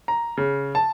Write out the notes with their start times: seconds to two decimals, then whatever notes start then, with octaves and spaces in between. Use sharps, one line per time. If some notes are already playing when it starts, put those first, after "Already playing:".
0.08 A#5
0.37 C#3
0.75 A5